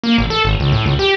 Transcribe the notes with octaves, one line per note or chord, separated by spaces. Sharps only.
A#3
A1
A4
G#1
C#2
A2
C#2
G4